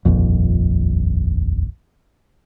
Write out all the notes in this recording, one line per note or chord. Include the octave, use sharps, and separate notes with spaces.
D#1 A#1 F2